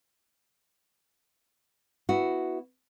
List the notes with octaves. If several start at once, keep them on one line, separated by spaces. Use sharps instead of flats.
B3 E4 F#4